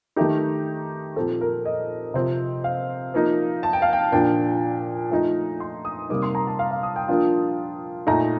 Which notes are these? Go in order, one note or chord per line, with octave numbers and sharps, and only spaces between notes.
D#3 A3 D#4 G4
A#2 F3 C4 A4
A#4
D#5
C3 F3 C4
F5
F3 A#3 D#4
A5
G5
F5
G5
A#2 F3 A#3 D4 G5
F3 A3 D#4
C6
D#6
C3 G3 A#3 D#4 D6
C6
A#5
A5
F5
F5
D#6
G5
F3 A#3 D4 F4
A#2 A3 D#4 A#5